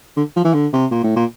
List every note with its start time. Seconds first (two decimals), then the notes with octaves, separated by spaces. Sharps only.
0.17 D3
0.36 F3
0.44 E3
0.54 D3
0.73 C3
0.91 A#2
1.04 A2
1.16 A#2